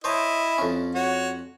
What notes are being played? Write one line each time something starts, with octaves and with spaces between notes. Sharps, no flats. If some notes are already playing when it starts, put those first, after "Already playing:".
E4 C5 C#5 D#5 A5
F2 C#4
F#4 C#5